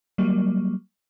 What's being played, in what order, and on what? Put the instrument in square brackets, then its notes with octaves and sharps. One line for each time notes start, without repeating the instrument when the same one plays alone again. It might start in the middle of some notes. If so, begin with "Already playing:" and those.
[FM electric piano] F#3 G3 A#3